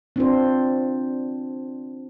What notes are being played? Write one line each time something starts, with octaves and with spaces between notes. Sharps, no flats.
C4 D4 F4 C5